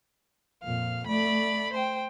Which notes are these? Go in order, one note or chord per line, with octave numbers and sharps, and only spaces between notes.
F2 A#2 F5
A3 D5 B5
C5 G5